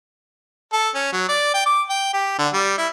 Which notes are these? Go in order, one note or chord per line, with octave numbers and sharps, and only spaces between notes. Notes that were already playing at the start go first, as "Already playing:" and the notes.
A4
C#4
F#3
D5
G5
D6
G5
G4
D3
G3
E4